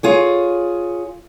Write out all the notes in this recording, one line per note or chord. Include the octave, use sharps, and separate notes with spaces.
F4 G#4 C#5